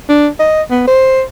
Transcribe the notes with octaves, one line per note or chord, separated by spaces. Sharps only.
D4
D#5
B3
C5